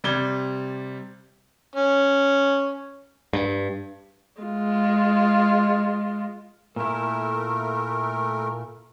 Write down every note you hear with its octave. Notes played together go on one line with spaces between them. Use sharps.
C3 G3 D5 G#6 G7
C#4
G2
G#3 F4
A#2 A3 E4 A#4